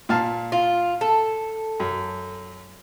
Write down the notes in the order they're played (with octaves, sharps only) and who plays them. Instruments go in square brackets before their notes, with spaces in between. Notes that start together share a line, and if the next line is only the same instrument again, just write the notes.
[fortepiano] A#2 F5 A5
[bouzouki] F4
A4
[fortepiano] F#2